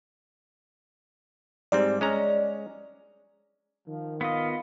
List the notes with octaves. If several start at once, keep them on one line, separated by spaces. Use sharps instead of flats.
G#2 G3 C4 D5
G#3 C#4 A#5
D#3 F3
B3 F4 D#5 F5